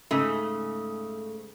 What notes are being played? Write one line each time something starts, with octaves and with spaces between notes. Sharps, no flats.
G#2 C#3 A3